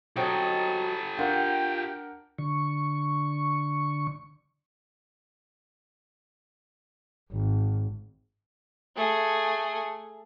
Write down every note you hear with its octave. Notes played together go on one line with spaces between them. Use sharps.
F#3 C4 D#4 G4 A4
D4 F4 A#4 F#5 G5
D3 C#6
G#1
A3 G#4